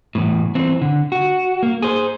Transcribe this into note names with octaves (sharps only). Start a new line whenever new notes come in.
E2 A2
E3 C4
D3
F#4
A#3
G#4 C5